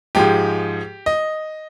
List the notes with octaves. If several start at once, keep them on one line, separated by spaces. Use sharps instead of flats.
G#2 F3 G#3 G4
D#5